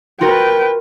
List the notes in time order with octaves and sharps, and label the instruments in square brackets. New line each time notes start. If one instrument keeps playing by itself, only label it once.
[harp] F4 F#4 A#4 [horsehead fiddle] B4 G5